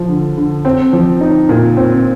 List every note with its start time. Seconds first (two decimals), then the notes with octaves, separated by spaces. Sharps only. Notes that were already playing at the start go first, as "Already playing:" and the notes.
Already playing: F3
0.08 D3
0.37 D3
0.65 C4
0.93 F3
1.21 D#4
1.49 A#2
1.77 C4